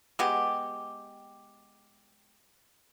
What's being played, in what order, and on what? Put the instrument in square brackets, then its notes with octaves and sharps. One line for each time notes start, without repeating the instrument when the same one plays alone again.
[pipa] G#3 B3 G4